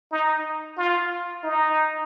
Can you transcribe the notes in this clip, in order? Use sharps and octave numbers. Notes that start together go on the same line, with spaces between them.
D#4
F4
D#4